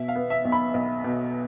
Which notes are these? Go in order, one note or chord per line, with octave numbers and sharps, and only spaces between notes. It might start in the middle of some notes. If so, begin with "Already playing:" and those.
Already playing: B2 E5
F5
B3
E5
B1
B5
B1
B2